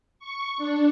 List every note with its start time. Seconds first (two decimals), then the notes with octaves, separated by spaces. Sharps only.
0.19 C#6
0.58 D4